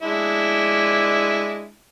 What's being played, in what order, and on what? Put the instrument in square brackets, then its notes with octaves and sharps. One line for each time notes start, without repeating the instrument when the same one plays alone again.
[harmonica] G#3 D4 E4